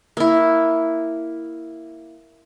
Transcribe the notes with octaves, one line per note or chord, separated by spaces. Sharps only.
A#3 E4